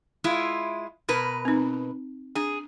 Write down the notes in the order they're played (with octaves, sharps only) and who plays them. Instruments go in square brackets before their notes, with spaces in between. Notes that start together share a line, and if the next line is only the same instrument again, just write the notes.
[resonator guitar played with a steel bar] G#3 E4 F4
B2 A#4 B4
[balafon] C4 D#4
[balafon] D4 [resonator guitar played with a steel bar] G#4